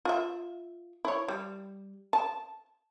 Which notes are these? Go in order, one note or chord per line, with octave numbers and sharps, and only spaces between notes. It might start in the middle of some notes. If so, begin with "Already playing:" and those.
F4 E5
E4 C#5
G3
A5